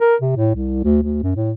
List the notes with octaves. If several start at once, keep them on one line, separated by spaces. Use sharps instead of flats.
A#4
C3
A2
C2
D2
D2
F#2
A2